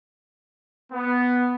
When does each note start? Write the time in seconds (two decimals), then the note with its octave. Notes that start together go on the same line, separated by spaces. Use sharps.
0.93 B3